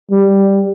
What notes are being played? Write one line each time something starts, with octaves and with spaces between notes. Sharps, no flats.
G3